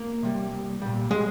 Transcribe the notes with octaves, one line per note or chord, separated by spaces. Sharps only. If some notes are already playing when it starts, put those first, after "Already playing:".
Already playing: A#3 A#4
C3 G3
C2
A#2 G3
G#3 G#4